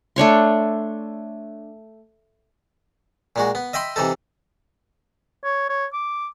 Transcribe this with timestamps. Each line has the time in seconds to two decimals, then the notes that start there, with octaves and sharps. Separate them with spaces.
0.16 A3 D4 C#5 C6
3.36 A#2 G#3 F#4
3.55 B3
3.73 D#5 E5 G5 B5 C6
3.96 C3 E3 D#4 A4
5.44 C#5
5.69 C#5
5.93 D6